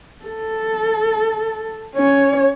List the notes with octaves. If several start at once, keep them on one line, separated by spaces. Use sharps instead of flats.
A4
C#4 C#5